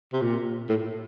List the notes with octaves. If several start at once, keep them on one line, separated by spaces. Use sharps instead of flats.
C3
A#2
A2